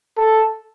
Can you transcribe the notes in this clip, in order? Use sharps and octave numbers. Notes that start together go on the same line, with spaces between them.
A4